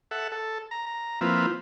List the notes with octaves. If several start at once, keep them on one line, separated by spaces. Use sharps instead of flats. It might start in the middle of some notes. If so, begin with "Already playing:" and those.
A4 E5 F#5
A4
A#5
A#5
F3 A#3 C4 E4 F4 B4